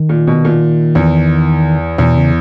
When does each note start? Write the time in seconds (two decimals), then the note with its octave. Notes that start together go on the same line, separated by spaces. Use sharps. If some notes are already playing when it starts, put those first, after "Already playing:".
Already playing: D#3
0.09 A#2
0.27 B2
0.45 A#2
0.95 E2
1.98 E2 B2
2.16 C#3